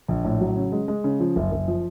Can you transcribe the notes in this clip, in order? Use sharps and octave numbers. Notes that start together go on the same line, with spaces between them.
A#1
A2
F#3
C#3
G#3
G#3
C#3
F3
F#1
F#1
F3